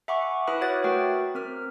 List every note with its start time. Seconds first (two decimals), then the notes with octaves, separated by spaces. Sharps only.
0.08 E5 F#5 G#5 B5 C#6 D6
0.47 E4 B4 B5 D#6 F6 F#6
0.61 F#4 C#5 F#5 D6 A6
0.84 A3 F#4 A#4 B4 G5
1.35 C4 A#4 F6